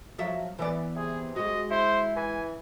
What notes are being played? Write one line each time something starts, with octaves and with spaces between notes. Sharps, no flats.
F3 F#3 E5
E3 B3 D5
C3 G#4
G#3 F#4 D#5
E4 C5
E3 G#5